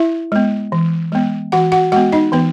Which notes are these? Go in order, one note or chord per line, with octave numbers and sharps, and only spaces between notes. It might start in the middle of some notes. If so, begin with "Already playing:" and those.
Already playing: E4 E5
G#3 B3
E3
G#3 B3
E3 F#4 F#5
F#4 F#5
G#3 B3 F#4 F#5
D#4 D#5
E3 B3 B4